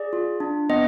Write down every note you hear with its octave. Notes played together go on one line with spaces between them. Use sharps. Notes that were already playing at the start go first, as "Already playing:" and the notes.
Already playing: G#4 D5
F4
D4
B3 D#5